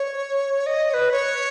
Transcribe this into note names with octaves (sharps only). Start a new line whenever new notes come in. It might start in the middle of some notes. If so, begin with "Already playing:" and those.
Already playing: C#5
D#5
C#5
B4
C#5